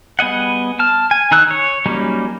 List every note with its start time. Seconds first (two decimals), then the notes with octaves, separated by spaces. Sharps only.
0.19 G3 B3 G#4 D#5 F#5
0.79 A5 F6
1.11 G#5
1.31 D#3 D#4 G#4 E6 F#6
1.51 C#5
1.86 F#3 G3 A#3 C#4 D#4